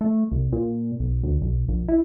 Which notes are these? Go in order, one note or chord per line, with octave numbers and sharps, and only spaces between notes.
A3
C2
A#2
B1
D2
B1
A#1
E4